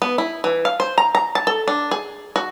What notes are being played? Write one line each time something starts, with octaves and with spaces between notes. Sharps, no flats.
B3
E4
E3
F5
C5
A#5
A#5
A5
A4
D4
G#4
F#4